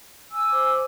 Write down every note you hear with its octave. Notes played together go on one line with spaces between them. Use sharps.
G#5 E6
C5 D6